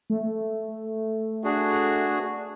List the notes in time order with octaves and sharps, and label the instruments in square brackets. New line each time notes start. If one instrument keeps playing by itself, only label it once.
[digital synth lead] A3
[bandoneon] D4 F#4 G#4